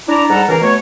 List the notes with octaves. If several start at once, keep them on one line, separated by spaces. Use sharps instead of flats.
D4 E4 D5 A#5
G#2 G3 A4 F#5 A#5
C#2 E3 A#3 A#4
B2 A3 C#5